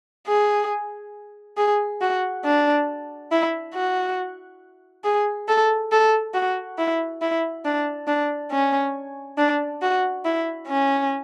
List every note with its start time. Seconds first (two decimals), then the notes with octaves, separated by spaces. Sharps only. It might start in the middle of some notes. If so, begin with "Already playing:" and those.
0.27 G#4
1.57 G#4
2.01 F#4
2.45 D4
3.31 E4
3.74 F#4
5.04 G#4
5.48 A4
5.92 A4
6.34 F#4
6.78 E4
7.22 E4
7.65 D4
8.07 D4
8.51 C#4
9.38 D4
9.82 F#4
10.25 E4
10.68 C#4